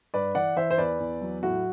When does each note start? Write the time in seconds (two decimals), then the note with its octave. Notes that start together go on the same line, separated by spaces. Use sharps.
0.14 G2 B4 D5
0.35 E3 D5 F#5
0.56 E3 C5 E5
0.71 C5
0.78 E2 B4 D5
1.00 E2
1.22 F#3
1.43 A2 F#4